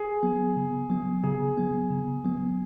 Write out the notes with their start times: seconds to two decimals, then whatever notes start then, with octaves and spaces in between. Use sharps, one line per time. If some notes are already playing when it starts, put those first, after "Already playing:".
Already playing: G#4
0.23 F#3 B3
0.56 C#3
0.90 F#3 B3
1.24 C#3 G#4
1.57 F#3 B3
1.91 C#3
2.24 F#3 B3